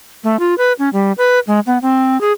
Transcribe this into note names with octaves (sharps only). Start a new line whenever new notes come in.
A3
F4
B4
C#4
G3
B4
G#3
B3
C4
G#4